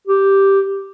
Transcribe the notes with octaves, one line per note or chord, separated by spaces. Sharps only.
G4